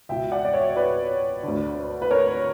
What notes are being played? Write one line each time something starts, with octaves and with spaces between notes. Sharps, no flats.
C#2 B2 E5 G5
D5 F#5
D5
C#5 E5
B4 D5
D2 D3
B4
A#4 C#5